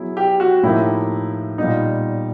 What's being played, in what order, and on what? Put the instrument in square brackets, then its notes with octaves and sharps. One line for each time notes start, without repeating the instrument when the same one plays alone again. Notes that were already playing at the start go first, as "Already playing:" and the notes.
Already playing: [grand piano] F#3 B3 E4 G#4
[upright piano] G4
F#4
[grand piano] A2 F3 A#3 D#4 G4 [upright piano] E4
[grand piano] A#2 G3 B3 [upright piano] D#4